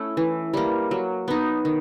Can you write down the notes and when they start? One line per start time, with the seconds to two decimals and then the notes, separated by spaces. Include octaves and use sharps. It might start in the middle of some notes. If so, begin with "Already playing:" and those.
Already playing: A3 C#4 E4
0.17 E3
0.53 G3 A#3
0.91 F#3
1.28 B3 D#4
1.65 D#3